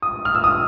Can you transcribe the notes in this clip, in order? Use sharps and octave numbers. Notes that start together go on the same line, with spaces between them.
D#6
F6
E6
D#6